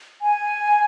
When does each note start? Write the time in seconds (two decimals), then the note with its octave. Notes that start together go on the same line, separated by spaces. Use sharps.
0.22 G#5